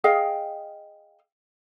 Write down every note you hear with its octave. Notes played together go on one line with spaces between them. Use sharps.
G#4 D#5 F5 G5